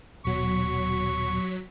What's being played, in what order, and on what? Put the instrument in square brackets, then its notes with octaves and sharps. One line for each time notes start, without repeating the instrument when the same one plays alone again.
[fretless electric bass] D#1 B2 [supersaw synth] F#3 B6 [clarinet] C#6